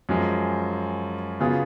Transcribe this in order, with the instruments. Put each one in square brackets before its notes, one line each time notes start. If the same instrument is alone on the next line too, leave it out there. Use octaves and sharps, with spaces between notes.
[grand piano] F#2 F3 G#3
C#3 F#3 B3 F4 G#4